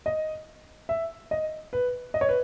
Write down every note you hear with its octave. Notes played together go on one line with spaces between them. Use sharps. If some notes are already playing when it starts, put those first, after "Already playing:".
D#5
E5
D#5
B4
D#5
C#5
B4